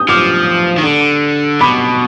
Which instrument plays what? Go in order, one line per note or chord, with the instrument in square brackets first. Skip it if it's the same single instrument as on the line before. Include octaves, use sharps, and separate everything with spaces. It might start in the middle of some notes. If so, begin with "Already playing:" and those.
Already playing: [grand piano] D#6 G6
[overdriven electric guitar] F3 [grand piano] D6 F6
[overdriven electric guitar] D#3
D3
[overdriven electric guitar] B2 [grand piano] B5 D6